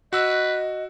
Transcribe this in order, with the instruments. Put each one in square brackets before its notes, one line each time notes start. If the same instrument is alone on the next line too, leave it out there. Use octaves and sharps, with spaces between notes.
[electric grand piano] F#4 E6 [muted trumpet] B4 [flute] D#5